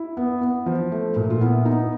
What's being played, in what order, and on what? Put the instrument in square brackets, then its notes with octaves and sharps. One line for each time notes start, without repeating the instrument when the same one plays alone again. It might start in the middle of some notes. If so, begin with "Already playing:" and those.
Already playing: [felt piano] E4
B3
B3
F3
A3
A#2
F4
B3 E4
B3 D#4